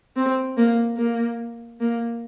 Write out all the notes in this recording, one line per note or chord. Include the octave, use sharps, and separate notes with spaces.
C4
A#3
A#3
A#3